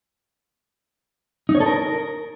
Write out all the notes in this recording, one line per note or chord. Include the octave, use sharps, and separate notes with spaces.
D#4
C#5
A4
A#4